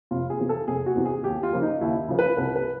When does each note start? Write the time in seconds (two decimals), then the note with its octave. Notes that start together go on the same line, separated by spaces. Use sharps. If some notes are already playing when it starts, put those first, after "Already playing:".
0.11 F1 F4
0.30 G#4
0.39 E2 C3 E3
0.49 A4
0.68 F1 G#4
0.86 F#4
0.95 E2 C3 E3
1.05 G#4
1.24 D#2 G4
1.43 F4
1.53 C#3 F3 A#3
1.62 D#4
1.81 D#2 E4
2.08 C#3 F3 A#3
2.19 B4
2.37 C2 B4
2.56 B4